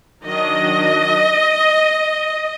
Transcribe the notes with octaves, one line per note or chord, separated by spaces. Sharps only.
D#3 F#3 D4 D#5